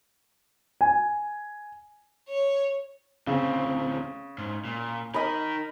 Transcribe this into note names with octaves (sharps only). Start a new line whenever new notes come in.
G#5
C#5
D2 C#3 C4
G#2
A#2
D#4 A#4 D#5 B5